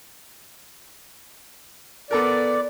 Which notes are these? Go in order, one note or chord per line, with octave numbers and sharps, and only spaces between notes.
B3 A4 A#4 D5